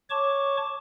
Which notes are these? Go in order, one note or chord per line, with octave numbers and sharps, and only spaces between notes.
C#5 A5 C#6 D6